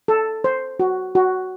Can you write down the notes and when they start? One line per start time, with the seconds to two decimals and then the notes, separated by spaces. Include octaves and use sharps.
0.08 A4
0.44 C5
0.80 F#4
1.15 F#4